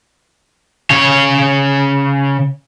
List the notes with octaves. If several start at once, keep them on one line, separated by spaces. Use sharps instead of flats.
C#3 C#5